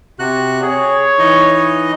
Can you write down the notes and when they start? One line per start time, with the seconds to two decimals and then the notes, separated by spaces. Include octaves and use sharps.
0.19 C3 F#4 F#6
0.62 G#4 C#5
1.19 E3 D#4 D#5